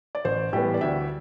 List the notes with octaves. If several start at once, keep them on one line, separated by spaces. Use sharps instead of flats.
D5
A1 C5
A2 E3 G3 B3 G4
D5
D2 E5